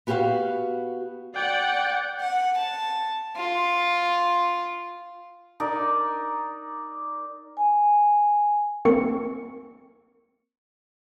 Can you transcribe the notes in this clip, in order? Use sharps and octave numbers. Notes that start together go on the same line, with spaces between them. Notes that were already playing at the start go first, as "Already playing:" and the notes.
B3 F#4 G4 B4 F5 F#5
D5 F#5 G5
F#5
A5
F4
D#4 A#4 D5 D6
G#5
A#3 C4 A#4 C#6 C#7